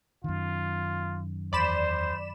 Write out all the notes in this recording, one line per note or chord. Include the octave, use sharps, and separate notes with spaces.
F#2 D#3 F4
E2 C5 D5 B5 E7